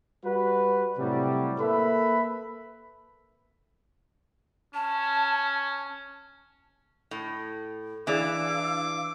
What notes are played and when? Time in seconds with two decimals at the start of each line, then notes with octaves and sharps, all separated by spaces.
0.24 G3 F#4 B4
0.98 A2 C3 F#3 G3
1.60 A#3 A4 B4 E5 B5
4.74 C#4 A5
7.11 A2
8.07 E3 D4 E4 G#4 D5 F5 D6 E6